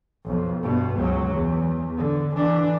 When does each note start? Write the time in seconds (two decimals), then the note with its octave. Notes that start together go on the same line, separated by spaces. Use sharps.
0.25 B1 F2
0.63 G2 B2
0.97 C#2 F#3
1.32 E2
1.97 D3
2.36 E3 D4